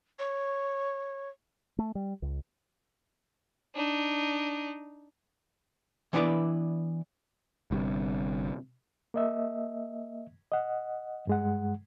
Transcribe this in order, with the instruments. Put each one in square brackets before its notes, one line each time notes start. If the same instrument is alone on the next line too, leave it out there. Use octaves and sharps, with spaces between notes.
[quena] C#5
[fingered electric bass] A3
G3
C#2
[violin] D4 D#4
[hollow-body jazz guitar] E3 B3 D4 E4 B4 D5
[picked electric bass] G1 G2 C3
[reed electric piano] A#3 D#5 E5
D#5 F#5
G2 G#3 F#5